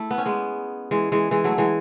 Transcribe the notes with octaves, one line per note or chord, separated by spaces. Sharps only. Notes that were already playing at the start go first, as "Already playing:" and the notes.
Already playing: A3 E4
B3
C#4
G#3 B3
E3 G#3
E3 G#3
E3 G#3
F#3 A3
E3 G#3